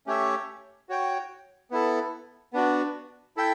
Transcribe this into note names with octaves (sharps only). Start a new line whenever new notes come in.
A3 C#4 G4 C#5 E5
F#4 C#5 G5
B3 E4 A4
B3 D4 F#4
E4 A4 E5 G5